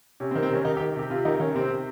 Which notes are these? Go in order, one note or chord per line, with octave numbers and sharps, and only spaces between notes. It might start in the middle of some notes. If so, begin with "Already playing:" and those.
C3 C#4
C4
D#3
C4
C3 C#4
D#3 D#4
G4
D#3
C3 G4
C3 F4
D#3 D#4
D#3 C#4
C3 C4
C3